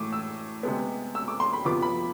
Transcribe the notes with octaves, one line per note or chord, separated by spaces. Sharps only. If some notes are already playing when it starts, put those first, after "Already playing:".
Already playing: A2 E3 A3 D6
E6
C3 G#3 B3
E6
D6
C6
B5
C3 F3 B3 D6
B5